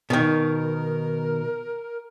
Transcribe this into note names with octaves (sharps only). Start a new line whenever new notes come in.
B2 D#3 A#4